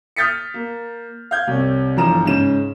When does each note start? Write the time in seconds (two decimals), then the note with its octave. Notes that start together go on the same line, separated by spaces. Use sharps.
0.16 D#6 F6 G6 A6 B6 C#7
0.54 A#3
1.31 F5 G6 G#6
1.47 C2 C3 C#5
1.96 G1 E3 F3 A#5 E7
2.25 G#2 C#3 C#4 E7